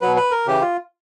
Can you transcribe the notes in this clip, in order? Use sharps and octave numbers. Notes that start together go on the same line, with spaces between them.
B2 F#3 B4
B4
A#4
C#3 E3 G4
F4